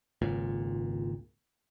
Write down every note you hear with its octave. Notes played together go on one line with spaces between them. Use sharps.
G#1 C#2 A#2